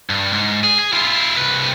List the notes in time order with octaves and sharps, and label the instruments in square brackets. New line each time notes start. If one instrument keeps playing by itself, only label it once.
[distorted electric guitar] G2
G#2
G#4
G#4
E4 F4
C2 B4